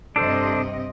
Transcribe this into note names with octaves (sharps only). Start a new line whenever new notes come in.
G2 C3 D4 A4 C5 D#5